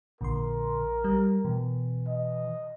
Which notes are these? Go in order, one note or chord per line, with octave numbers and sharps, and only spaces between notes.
A#1 A#2 D3 A#4 C6
G3
B2 E3
D#5